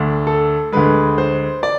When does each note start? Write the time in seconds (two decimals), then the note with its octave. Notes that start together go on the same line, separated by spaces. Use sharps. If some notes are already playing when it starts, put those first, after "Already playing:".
Already playing: D2 D3 A3 D4
0.27 A4
0.72 D2 D3 G#3 B4
1.18 C5
1.63 D5